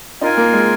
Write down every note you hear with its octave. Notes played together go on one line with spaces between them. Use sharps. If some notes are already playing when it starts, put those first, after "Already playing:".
D#4 F4 A#4 G#5
A#3
G#3